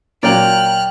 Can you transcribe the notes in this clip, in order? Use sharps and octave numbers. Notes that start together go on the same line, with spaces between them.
A#2 F#3 A#3 D5 G5 F6 F#6